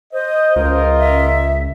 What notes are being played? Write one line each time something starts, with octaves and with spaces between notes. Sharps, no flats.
C5 D#5
C#2 F4 A#4 D#5
E5